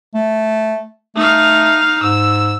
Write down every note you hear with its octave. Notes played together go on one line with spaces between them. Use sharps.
A3
A3 D#4 F5
G#2 E6